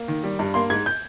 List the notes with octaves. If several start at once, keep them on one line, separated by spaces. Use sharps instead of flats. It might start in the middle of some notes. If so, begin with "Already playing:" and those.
Already playing: A#3
D#3
G3
G2
A#3 C6
G#2 G#6
G6